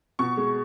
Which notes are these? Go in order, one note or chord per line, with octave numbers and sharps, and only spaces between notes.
B2 C#6
G#3